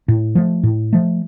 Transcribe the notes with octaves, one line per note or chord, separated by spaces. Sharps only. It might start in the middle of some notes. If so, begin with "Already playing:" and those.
A2
F3 A3
A2
F3 A3